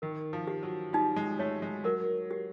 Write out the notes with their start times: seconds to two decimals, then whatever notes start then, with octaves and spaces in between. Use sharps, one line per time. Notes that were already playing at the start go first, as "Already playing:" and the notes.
0.02 D#3 A#4
0.33 F3
0.47 G4
0.63 F#3
0.93 G3 D#4
1.16 G#3
1.39 A3 C#5
1.62 G#3
1.84 F#3 A#4
2.31 G4